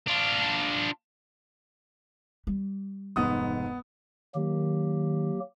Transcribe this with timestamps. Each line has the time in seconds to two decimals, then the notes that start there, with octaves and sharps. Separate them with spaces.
0.07 D4 F4
2.47 G3
3.16 F1 G#2 B3 D#6
4.35 D#3 F#3 A#3 G4